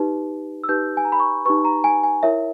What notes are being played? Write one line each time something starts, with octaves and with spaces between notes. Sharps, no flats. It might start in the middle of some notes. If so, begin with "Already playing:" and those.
Already playing: D#4 G4 B4
E6
D#4 G4 B4 G6
G#5
A#5
B5
C#6
D#4 G4 B4 C#6
A#5
G#5
G#5
E4 A#4 C#5 E5